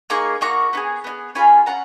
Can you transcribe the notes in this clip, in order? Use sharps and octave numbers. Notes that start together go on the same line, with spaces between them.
A#3 D#4 G#4 A#5 C#6
A#3 D#4 F#4 A#5 C#6
B3 D#4 G#4
B3 D#4 G#4
C#4 F4 G#4 G#5 B5
C#4 F4 F#5 A#5